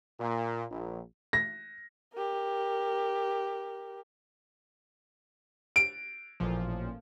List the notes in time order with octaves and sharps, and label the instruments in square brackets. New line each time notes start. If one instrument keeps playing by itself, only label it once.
[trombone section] A#2
A#1
[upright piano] A#6
[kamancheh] G4 A#4
[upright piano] D7
[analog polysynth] A1 A#2 F3